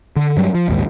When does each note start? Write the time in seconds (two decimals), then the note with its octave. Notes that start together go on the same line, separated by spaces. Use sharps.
0.16 D3
0.36 G2 F#3 G3
0.55 F3
0.68 A#1 D#2 G#2